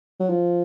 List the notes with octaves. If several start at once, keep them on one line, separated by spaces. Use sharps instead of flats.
F#3
F3